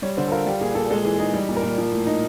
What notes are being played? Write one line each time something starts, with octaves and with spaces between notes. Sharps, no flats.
G3 C#5
D3 C5
A4
F4 A#4
G3 G4
A#2 G#4
A#2 A4
G#3 A4
E3 G#4
D#4 G#4
G3
A#2
A#4
A#2
F3
A2
D#4